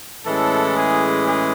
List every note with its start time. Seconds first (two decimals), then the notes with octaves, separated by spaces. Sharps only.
0.25 A2 E3 G#3 C#4 A4
0.75 G#4
1.24 G#4